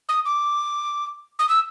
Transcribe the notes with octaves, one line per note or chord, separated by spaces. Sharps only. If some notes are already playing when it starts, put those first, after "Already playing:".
D#6
D6
D#6
E6